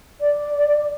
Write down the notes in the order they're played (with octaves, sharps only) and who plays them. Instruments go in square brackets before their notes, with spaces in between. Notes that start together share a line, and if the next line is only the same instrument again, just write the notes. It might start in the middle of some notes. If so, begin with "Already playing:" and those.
[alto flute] D5